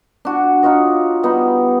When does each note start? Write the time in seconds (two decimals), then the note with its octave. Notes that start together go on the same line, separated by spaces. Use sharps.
0.25 D4 F#4
0.63 D#4 F4 C#5 D#5
1.23 G3 B3 D#4